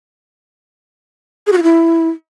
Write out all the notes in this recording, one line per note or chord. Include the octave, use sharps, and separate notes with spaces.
G#4
F#4
F4
E4